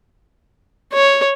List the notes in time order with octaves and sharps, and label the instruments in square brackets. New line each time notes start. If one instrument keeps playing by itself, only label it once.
[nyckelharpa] C#5